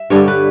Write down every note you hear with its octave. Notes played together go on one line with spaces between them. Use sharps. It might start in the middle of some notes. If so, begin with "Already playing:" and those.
Already playing: E5
G2 D3 G3 C#5
B4